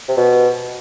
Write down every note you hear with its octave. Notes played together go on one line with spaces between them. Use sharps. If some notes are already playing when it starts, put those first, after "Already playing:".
C3
B2